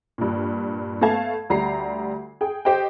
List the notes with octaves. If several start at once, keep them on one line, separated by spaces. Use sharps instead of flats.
G2 A#2
A3 B3 F5 A5 G#6
D2 G3 A#5 C7
G#4 G5
G4 C5 D#5 G5